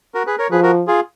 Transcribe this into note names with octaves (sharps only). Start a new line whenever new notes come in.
F#4 A#4
G#4 B4
A#4 C#5
F3 G#4 B4
F#4 A#4
F4 G#4